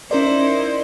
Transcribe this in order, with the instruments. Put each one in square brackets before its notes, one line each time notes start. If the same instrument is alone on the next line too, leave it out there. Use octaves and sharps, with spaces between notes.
[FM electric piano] C#4 A#4 D5 [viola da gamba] D#4 E4 C5